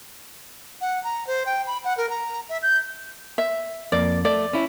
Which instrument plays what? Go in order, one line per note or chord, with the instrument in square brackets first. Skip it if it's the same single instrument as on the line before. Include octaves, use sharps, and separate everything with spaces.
[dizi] F#5
A#5
C5
G5
B5
F#5
A#4
A#5
E5
G6
[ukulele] E5
[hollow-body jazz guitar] F2 A#3 [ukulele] D5
[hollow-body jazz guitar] A3 [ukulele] D5
[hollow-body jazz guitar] C#4 E4